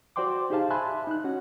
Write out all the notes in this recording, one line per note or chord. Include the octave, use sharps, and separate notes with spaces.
F#4 C5 D5 G5 C6 D6
D#4 G4 G#4 C5 F5 A5
E5 G#5 A5 B5 C6 F#6
D#4 F#6
C#4 F#4 F#5